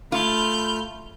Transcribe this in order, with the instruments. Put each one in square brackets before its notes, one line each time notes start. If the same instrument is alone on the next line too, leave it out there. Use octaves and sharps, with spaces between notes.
[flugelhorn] A3 [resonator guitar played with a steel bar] F4 [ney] B5 [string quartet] F6 G6